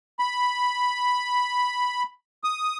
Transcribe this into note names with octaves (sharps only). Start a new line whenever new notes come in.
B5
D#6